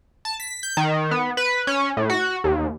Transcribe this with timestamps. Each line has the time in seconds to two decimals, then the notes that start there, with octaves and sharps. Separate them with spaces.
0.25 A5
0.40 B6
0.63 G6
0.77 D#3
1.11 B3
1.37 B4
1.67 C#4
1.97 A2
2.10 F#4
2.44 D#2